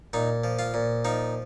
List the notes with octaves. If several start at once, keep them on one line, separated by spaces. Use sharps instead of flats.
A#2 D#4
F3
F4
A#2
F3 D#4